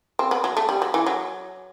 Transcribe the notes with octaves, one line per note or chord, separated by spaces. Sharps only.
C4
B3
F#3
A3
G3
F#3
E3
F#3